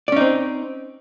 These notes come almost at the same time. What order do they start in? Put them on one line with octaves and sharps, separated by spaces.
D5 C#4 D#4 C4